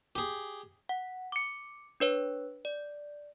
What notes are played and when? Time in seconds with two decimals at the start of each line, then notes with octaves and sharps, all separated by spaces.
0.16 G4 G#4
0.89 F#5
1.32 D6 C#7
2.00 D4 B4 C#5
2.65 D5